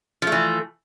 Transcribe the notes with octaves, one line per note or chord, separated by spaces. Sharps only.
E3 F3 A3